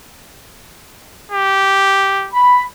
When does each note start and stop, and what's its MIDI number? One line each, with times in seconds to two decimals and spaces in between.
1.32 2.30 67
2.34 2.63 83